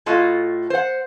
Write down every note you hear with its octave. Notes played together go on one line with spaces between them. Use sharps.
A2 F4 F#4 A4 D#5
C5 F#5